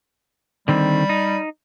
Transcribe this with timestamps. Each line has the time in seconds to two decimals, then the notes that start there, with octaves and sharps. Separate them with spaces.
0.68 D3 D#3 G3 C4
1.09 D#4